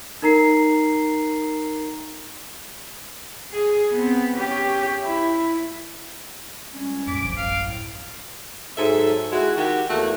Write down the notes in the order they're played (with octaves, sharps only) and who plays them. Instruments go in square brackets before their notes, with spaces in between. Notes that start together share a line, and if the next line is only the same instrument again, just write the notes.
[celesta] D#4 A#4 A#5 C7
[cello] G#4
B3 C4
C#4 G4
E4
[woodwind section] C#2 G3 C#4
[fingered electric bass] F#2 A#2 [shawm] D6 [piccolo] B6
[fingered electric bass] D1 A1 F#2 [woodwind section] F3 [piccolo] D7
[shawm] F5
[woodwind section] A2
[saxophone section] G#2 F#3 A4 E5
G#3 E4 F#4
D#3 F#4 G4
E2 A3 A#3 F#4